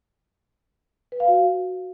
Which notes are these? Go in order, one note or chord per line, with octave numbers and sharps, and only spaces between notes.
B4
F5
F#4